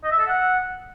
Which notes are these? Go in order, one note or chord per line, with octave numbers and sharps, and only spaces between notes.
D#5
E5
A4
F#5